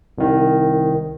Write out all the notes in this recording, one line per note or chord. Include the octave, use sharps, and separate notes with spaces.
C2 D#3